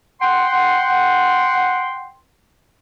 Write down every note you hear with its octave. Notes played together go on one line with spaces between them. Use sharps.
F#5 G5 C6